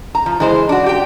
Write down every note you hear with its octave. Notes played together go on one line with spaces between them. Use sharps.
A#5
F3
E3 G#3 C5
D4 F#4
G4 G5